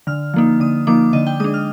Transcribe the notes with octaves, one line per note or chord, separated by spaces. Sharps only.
D3 F6
F3 A#3 D#4
D3 D#6
F3 A#3 D#4 D6
D3 D#5
G5
G#3 D4 D#6
F6